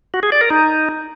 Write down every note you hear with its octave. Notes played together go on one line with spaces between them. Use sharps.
F#4
G#4
D5
A#4
D#4